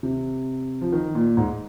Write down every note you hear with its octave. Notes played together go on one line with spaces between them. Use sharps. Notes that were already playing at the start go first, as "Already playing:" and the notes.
C3
F3
D#3
A#2
G#2